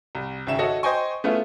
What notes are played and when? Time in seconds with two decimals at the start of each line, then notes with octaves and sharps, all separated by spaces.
0.15 C2
0.47 G#1 C#3 E5 E7
0.59 F#4 A4 C#5 D#5 E5 F#5
0.83 C5 D#5 G5 G#5 C#6
1.24 A3 B3 C#4 E4 F4